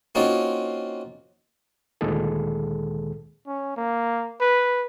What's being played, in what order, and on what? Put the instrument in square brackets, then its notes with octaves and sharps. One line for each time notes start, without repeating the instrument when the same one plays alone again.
[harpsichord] A#3 C4 C#4 D#4 F4 F#4
[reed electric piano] D2 A#2 D#3 G#3 G#4 A4
[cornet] C#4
A#3
B4